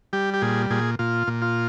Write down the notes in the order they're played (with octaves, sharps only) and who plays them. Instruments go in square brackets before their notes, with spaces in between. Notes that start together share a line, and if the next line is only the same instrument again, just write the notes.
[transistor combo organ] G3 G4
G4
A#2 G#4
A#2 G#4
A#2 F4
A#2
F4